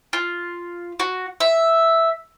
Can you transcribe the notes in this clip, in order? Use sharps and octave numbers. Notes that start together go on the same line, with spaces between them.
F4
F#4
E5